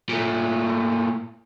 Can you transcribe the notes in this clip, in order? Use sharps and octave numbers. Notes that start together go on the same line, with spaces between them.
A#2 A3